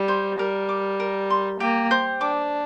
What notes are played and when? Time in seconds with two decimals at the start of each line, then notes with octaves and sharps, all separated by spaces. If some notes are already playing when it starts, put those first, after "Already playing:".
Already playing: G3
0.08 C5
0.39 G3 A#4
0.69 D6
1.00 A#4
1.30 C6
1.60 A#3 G4
1.91 C5
2.21 D4 D6